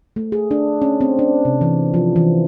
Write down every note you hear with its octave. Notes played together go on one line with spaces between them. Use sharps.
A3
G#4
D4
C#4
C4
D4
C3
E3
F3
E3